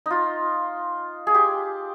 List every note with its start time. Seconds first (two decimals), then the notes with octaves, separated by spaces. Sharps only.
0.06 D#4 F4
1.27 G#4
1.35 G4